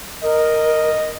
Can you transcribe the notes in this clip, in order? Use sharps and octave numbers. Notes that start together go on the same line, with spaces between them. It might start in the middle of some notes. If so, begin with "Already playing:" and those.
A#4 D#5